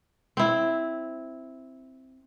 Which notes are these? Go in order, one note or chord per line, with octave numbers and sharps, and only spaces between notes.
C4 E4